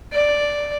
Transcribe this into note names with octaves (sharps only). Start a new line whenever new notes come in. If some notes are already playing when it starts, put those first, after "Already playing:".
D5